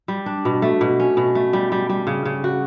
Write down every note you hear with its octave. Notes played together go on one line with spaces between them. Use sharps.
G3
D4
B2
A3
B2
C#4
B2
A3
G3
G3
G3
C#3
C#3
F#4